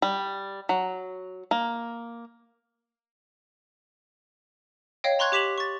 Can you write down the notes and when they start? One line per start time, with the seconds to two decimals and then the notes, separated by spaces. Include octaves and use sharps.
0.02 G3
0.69 F#3
1.51 A#3
5.04 C#5 D#5 F5 G5
5.19 A#5 C6 C#6 F#6 G#6
5.32 G4 D6 B6 E7 F#7
5.58 C#6 A6